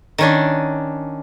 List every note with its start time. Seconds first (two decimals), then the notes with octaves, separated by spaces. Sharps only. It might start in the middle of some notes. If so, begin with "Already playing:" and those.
0.18 D#3 C#4 D4